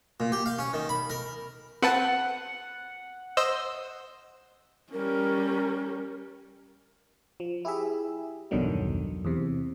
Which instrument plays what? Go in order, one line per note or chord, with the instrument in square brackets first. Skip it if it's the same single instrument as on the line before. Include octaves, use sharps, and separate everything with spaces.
[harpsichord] A#2
G4
F5
C#4
D#3
B5
A#4
[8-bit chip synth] C4 B4 A5 [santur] F#5
[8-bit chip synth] C5 D#5 E6
[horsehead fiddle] G3 C#4 [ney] A#4
[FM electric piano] F3
E4 G4 G#4 E5
B1 E2 G2 D3 D#3 F#3
E2 C3